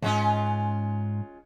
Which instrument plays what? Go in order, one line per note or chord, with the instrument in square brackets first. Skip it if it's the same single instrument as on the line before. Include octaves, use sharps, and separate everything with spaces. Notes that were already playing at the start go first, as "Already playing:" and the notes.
[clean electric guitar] C#2 G#2 [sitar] G#3 C#4 F4